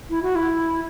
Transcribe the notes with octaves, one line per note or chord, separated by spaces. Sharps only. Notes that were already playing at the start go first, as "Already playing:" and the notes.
E4
F#4
E4